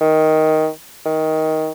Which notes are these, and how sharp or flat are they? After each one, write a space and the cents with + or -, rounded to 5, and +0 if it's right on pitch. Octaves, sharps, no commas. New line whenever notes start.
D#3 +10
D#3 +15